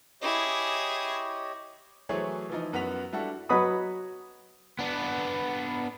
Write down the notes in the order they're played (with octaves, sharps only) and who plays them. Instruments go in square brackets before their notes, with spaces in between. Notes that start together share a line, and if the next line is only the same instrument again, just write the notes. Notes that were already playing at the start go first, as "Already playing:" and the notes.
[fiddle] E4 G#4 [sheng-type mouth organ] G4 C#5 D#5
[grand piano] E3 F#3 A3 G#4 C5 C#5
E3 F3 D#4
F#2 B3 F#4 B6 F7
G3 D4 E4 F#4 A4
[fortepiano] F#3 B4 D#5 F#5 B5 D#6
[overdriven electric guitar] B3 D4